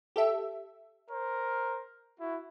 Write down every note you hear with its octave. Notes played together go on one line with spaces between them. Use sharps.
G4 A4 E5
A#4 C5
E4 F#4